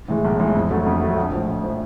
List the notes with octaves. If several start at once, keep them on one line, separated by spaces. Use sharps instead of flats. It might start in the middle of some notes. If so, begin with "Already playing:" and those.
A2 E3 G#3
B1
A2 E3 G#3
F2
D3 F#3 A3
F2
D3 F#3 A3
A#1
A2 F3
A#1
A2 F3